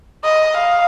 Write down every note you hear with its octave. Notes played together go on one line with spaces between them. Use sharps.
D#5
F5